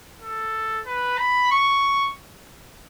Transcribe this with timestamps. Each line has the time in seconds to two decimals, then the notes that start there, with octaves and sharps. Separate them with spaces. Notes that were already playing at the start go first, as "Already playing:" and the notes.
0.21 A4
0.86 B4
1.19 B5
1.51 C#6